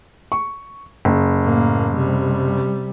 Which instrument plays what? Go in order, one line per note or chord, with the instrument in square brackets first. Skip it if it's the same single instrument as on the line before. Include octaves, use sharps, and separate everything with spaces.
[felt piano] C#6
F#1
[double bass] A2 A#3
C3 G3